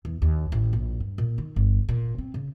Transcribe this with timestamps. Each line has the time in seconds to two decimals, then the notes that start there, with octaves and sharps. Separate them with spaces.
0.05 E2
0.22 D#2
0.52 A1
0.73 A#1
1.00 G2
1.18 A#2
1.38 D#3
1.56 G1
1.89 A#2
2.18 C4
2.34 C#3